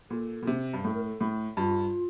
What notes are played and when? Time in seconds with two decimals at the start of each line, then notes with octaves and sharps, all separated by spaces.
0.10 A#2 A4
0.42 A#2
0.47 C3
0.73 G2
0.84 A2 A4
0.94 A#4
1.04 A4
1.21 A2
1.57 G2 F4